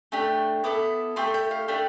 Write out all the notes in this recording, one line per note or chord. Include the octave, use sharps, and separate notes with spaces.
A3 D4 G4
B3 E4 A4 D6
A3 E4 G4 C6
G5
F5
A3 D4 G4